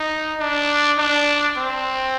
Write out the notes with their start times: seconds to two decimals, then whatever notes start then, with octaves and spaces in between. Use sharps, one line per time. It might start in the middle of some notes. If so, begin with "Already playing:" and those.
Already playing: D#4
0.40 D4
0.98 D4
1.57 C4